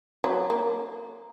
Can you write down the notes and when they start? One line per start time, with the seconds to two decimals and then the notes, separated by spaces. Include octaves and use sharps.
0.24 F#3
0.50 A#3